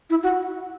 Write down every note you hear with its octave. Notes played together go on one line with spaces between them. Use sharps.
E4
F#4